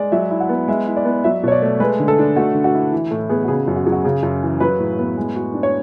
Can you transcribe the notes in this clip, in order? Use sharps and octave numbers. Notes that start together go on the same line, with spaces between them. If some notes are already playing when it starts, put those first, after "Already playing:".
Already playing: G#3 D5
F#3 E5
E4
F#5
B3
G#3 E5
E4
D5
B3
F#3 E5
B2 C#5
D5
A3
G#3 B4
D3
A4
D4
A3 F#4
D3
F#4
E4
E3
A2 A4
B3 G#4
F#4
C#3 G#4
F#2
F#4
F#3 G#4
F#4
C#3 G#4
F#2
E3
F#3 B4
A2
B3
G#3
F#4
D4
C#5